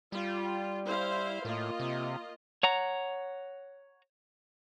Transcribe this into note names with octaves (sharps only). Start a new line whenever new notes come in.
G3 F4
E4 C5 F5
A2 A#3 F4 D#5
C3
C#5 F#5 A#5